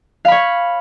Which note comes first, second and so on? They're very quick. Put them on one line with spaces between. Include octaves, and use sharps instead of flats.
F5 B5 C#5